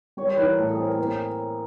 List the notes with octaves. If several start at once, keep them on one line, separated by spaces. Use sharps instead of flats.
G3 C#5
C5
E3 B4
A#4
A2 A4
G#4
C4
A#4
A#3